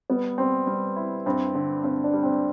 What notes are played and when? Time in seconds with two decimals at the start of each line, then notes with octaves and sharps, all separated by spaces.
0.10 G3 B3
0.38 G3 C4
0.67 G3
0.96 E4
1.26 G2 C4
1.55 D3
1.84 G2 C4
2.04 D4
2.13 G3
2.23 C4